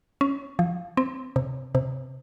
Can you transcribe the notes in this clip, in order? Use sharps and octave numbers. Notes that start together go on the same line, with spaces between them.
C#4
F3
C4
C3
C3